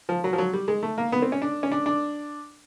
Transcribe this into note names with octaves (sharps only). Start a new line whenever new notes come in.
F3
F#3
F3
F#3
G3
G#3
A3
A#3
B3
C4
C#4
D4
C#4
D4
D4